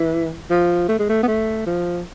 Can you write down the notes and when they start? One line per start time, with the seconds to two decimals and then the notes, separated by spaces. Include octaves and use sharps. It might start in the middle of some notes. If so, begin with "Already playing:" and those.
Already playing: E3
0.50 F3
0.88 A3
0.99 G#3
1.09 A3
1.23 B3
1.28 A3
1.66 F3